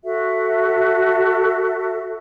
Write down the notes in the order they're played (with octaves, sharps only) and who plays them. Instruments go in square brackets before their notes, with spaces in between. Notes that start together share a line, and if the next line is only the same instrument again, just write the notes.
[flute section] F#4 A4 E5